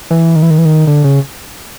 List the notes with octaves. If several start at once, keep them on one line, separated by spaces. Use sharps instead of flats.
E3
D#3
E3
D#3
E3
D#3
D3
C#3